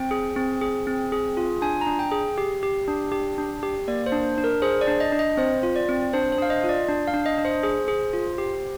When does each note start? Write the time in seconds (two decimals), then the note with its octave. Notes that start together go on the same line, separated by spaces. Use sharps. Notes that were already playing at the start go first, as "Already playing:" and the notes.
Already playing: C4 G5
0.11 G#4
0.36 C4
0.61 G#4
0.87 C4
1.12 G#4
1.37 F4
1.62 D4 G#5
1.81 A#5
1.86 D4
1.99 G5
2.12 G#4
2.38 G4
2.63 G4
2.88 D4
3.12 G4
3.38 D4
3.63 G4
3.88 A#3 D5
4.06 C5
4.12 D4
4.38 D4
4.44 A#4
4.62 G#4 C5
4.81 D5
4.87 D4
5.00 D#5
5.12 D4
5.19 D#5
5.37 C4 C5
5.63 F4
5.76 D5
5.89 C4
6.14 D4 C5
6.32 C5
6.38 D4 F5
6.50 D#5
6.64 F4
6.69 D5
6.89 D4
7.08 F5
7.14 D4
7.26 D#5
7.38 D4
7.45 C5
7.63 G#4
7.88 G#4
8.13 F4
8.38 G4